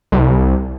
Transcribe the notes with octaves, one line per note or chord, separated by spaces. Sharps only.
C2